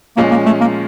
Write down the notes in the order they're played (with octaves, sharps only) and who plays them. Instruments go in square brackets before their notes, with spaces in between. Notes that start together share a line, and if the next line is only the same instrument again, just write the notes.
[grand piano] A#2 F3 G#3 C#4 [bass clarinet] A#3
[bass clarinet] A#3
A3
A#3